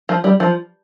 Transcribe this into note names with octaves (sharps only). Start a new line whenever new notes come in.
F3
G3
F3